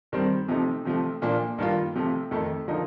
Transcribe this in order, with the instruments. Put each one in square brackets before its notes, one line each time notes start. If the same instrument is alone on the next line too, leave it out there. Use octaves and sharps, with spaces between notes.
[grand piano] G2 D#3 G3 C4
C3 F3 A3 D#4
C3 F3 A3
A#2 F3 A#3 D4
G2 D#3 A#3 F4
C3 F3 A3
F2 D#3 A3
D3 F3 A#3 D#4